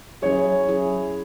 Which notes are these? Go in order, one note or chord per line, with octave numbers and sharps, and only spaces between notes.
F#3 C#4 E4 G#4 C#5
F#3 C#4 E4 G#4